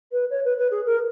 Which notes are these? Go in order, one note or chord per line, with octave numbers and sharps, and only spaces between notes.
B4
C#5
B4
B4
G#4
A#4